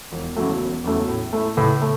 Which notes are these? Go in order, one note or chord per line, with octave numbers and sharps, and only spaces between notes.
E1
E2 C#3 F#3 A3
E1
E2 C#3 F#3 A3
A2
A3 E4
A2 C#3
A3